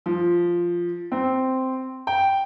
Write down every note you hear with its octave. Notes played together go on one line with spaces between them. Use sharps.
F3
C4
G5